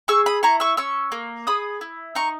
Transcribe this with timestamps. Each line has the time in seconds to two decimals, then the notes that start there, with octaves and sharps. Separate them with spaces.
0.08 G#4 C#6 E6
0.26 B5 D#6
0.43 E4 A#5 C#6
0.60 C#6 E6
0.77 C#4 C#6 E6
1.12 A#3
1.47 G#4 B5 D#6
1.81 E4
2.15 D#4 A#5 C#6